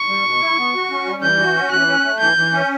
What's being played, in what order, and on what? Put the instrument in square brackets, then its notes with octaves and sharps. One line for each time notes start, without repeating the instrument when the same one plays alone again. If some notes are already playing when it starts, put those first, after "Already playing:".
Already playing: [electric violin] C#6
[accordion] G3
B2
E4
B3
F#4
C#4
G3
[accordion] E3 [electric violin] G6
[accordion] F#4
C#4
[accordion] E3 [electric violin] F#6
[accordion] C#4
A3
[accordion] E3 [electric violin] G6
[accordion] E3
C#4